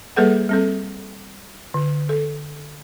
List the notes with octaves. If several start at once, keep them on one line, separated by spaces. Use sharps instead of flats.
G3 A#3 G#4 A4 B4 F#5
G3 C4 A4
D3
A4